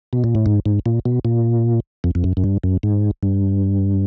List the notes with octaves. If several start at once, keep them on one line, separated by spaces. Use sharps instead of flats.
B2
A#2
A2
G#2
G#2
A#2
B2
A#2
F2
F2
F#2
F#2
G2
F#2
G#2
G2